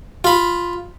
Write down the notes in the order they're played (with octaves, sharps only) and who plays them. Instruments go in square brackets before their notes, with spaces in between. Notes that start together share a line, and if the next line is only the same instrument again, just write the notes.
[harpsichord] F4 B5